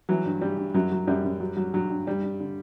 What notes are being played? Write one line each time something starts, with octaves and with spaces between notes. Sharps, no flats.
E3 F#3
G2
G2 G3
G2
F#2 F#3
F#3
F#2 G3
F#2
F#3
F#3
G2 F#3
G2
G2 G3
G2
D3